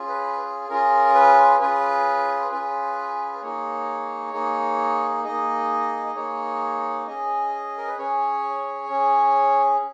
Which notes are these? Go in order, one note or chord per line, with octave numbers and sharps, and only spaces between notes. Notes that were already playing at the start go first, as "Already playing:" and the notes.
Already playing: C#4 F4 G#4
B4
C#4 F4 G#4 A#4
B4
C#4 F4 G#4 B4
C#4 F4 G#4 B4
A#3 D#4 G#4 C#5
A#3 D#4 G#4
A#3 D#4 G#4 D#5
D#5
A#3 D#4 G#4 C#5
C#4 G#4 D#5
A#4
B4
C#4 G#4 C#5
C#4 G#4